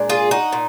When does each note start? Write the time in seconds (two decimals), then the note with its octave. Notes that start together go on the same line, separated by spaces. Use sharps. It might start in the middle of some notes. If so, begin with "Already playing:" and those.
Already playing: A#2 G#3 D4
0.09 F4 G#4
0.31 D#4 F#4
0.52 A#2